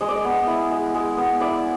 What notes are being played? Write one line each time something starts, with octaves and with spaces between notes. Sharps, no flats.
G#3 D#5
D5
D#5
B3
E4
G#3
G#3
B3
E4 D5